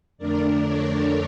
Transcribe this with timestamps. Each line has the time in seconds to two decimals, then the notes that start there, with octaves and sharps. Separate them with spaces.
0.18 F2 D3 A3 D4 A#4 D5
0.63 A4 C#5